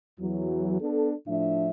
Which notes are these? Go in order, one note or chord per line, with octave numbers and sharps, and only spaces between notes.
E2 E3 F#3
B3 D4 A4
A2 F3 D4 E5